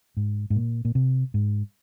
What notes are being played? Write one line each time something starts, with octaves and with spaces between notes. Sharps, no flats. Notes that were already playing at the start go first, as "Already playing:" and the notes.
G#2
G#2
A#2
A#2
C3
G#2